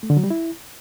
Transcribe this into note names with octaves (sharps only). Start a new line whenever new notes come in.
A3
D3
F#3
G3
E4